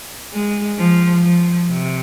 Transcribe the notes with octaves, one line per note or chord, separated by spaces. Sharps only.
G#3
F3
F3
C3